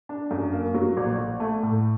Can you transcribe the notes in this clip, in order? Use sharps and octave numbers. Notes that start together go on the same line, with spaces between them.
D4
F#2
A#3
F#3
A#1
A#1
A3
A2